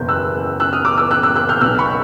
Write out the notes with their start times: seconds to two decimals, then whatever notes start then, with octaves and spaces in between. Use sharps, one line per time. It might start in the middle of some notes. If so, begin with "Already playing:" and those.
Already playing: F#1 E2 B2 G6
0.09 E6 F#6
0.60 E6 F#6
0.73 D#6 F6
0.85 D6 E6
0.98 D6 E6
1.11 E6 F#6
1.23 E6 F#6
1.36 E6 F#6
1.49 F6 G6
1.61 B1 B2 E6 F#6
1.79 B5 C#6